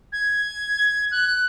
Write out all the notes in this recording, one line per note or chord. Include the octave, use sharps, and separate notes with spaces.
G#6
F#6